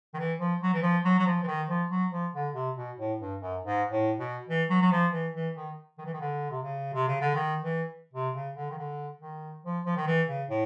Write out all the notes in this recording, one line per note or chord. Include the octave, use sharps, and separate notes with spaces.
D#3
E3
F3
F#3
E3
F3
F#3
F#3
F3
E3
D#3
F3
F#3
F3
D3
C3
B2
A2
G2
F#2
G#2
A2
B2
E3
F#3
F#3
F3
E3
E3
D#3
D#3
E3
D#3
D3
C3
C#3
C3
C#3
D3
D#3
E3
C3
C#3
D3
D#3
D3
D#3
F3
F3
D#3
E3
C#3
A2